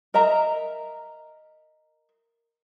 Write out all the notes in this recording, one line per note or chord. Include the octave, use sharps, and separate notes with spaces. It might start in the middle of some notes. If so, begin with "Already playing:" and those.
A#4 D#5 E5 A#5